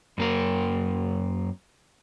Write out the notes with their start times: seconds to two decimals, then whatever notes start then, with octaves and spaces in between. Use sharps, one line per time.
0.18 F#2 A#3 A#4